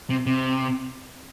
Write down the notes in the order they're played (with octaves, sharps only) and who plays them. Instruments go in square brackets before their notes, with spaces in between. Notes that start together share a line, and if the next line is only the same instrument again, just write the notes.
[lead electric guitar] C3
C3